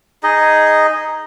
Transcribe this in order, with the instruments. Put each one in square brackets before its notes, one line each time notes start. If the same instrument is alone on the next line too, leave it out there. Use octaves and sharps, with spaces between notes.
[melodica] D#4 G#4 D#5